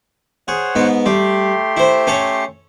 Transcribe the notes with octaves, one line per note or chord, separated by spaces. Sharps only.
G#4 C5 C#5 F#5
G#2 B3
G3 A3 G4 C6
E4 C5
C#4 A4 C#5